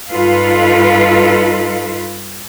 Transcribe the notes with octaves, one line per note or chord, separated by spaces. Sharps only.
G2 D#4 F4 A4 B4 F5